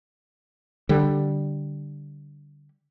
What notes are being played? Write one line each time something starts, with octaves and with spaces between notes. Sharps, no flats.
D3 G3